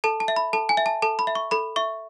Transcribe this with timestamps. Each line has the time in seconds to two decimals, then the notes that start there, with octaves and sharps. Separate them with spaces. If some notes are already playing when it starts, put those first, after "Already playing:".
0.04 A4 A5
0.20 A5
0.28 E5
0.36 B5
0.53 A4 A5
0.69 G#5
0.77 E5
0.86 A5
1.02 A4 A5
1.19 B5
1.27 E5
1.35 C#6
1.51 A4 B5
1.76 E5 C#6